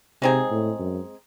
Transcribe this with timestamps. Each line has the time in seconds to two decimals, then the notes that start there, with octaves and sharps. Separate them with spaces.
0.21 C3 G#3 C4 D#4 G#4
0.51 A2
0.79 F#2